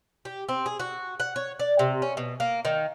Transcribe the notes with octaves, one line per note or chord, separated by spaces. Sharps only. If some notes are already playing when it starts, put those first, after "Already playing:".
G4
C4
G#4
F#4
F#5
C#5
D5
C3
C#4
B2
A#3
D#3